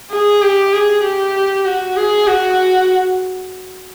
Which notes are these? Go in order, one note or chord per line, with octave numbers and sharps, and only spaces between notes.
G#4
G4
G#4
G4
F#4
G#4
F#4